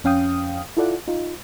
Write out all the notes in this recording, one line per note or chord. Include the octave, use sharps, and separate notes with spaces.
F2 C#4 F5 G5 D#6
E4 F4 A4 D5 F#5
D#4 F4